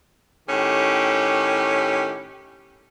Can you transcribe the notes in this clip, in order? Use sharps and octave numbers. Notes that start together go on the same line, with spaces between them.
A2 D#3 C#4 G4